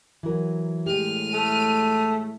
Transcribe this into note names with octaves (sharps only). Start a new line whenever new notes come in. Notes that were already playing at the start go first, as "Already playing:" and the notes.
E3 F#3 A#4
A2 G#3 G4 F6 D#7
A3